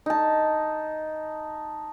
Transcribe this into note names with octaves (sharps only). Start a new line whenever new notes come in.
D#4 A5